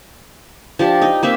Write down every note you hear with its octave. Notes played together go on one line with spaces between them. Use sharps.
F3 D4 G4
D#4 D#5
A#3 C4 D#4 E5